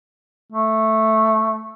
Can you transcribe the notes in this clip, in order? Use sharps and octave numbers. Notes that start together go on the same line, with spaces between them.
A3